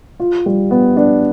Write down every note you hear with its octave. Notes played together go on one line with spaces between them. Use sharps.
F4
G3
B3
D4